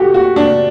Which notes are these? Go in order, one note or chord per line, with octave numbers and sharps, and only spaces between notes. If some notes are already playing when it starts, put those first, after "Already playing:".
Already playing: F#4 G4 A4
F#4
D4